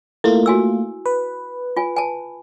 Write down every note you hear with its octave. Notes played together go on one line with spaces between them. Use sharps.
A3 A#3 E4 F4
F#4 G#5 E6
B4
F4 G#5
G#5 A5